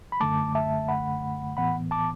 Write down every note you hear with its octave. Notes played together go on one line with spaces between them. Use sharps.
B5
F#2 D3 A3 A5 D6
E5 A5
F#5 B5
A2 E3 B3 F#5 B5
A5 D6